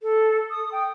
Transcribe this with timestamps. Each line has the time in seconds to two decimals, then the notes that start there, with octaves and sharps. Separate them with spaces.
0.02 A4
0.50 D#6
0.72 G5